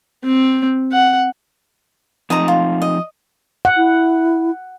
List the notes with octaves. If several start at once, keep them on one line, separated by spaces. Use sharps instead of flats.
C4
F#5
F3 C4 D#4 D#5 A5 A#5
F4
D#5
F#5
E4